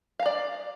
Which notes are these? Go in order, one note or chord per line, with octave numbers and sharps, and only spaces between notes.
D5 F5 A#5